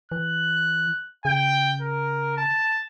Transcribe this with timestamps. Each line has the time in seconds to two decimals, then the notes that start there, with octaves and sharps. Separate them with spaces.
0.12 E3 F#6
1.25 C#3 G5
1.81 A#4
2.37 A5